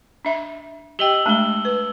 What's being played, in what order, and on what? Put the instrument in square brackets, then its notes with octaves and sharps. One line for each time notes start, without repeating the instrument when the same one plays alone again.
[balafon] D4 E5 B5
[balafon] G4 D#5 G5 [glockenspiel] E6 F#7 G7
[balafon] G#3 A3 D4 [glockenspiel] A5 G7
[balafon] B4